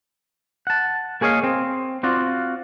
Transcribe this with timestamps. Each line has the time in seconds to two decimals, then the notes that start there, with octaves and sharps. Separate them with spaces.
0.67 F#5 A5
1.21 A#3 G#4 C#5 D#5 F5
1.43 C4
2.03 C4 F4 F#4 D5